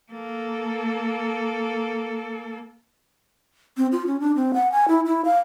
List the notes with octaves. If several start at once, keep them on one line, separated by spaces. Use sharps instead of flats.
A#3 A4
C4
F4
C#4
D4
C4
F#5
G#5
E4
E4
F5